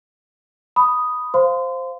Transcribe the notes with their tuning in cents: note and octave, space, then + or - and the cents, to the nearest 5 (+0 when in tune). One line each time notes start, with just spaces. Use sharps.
B5 +0 D#6 +0
C5 +0 F5 +0 C6 -30